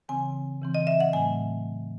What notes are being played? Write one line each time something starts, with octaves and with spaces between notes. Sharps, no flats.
C#3 E3 C4 G#5
C#3 E3 C4
D#5
E5
F#5
A2 F#3 A3 C4 G#5